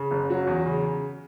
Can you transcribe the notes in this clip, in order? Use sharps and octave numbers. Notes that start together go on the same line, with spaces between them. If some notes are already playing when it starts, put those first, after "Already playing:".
Already playing: C#3
F#1
F#3
E2
C#3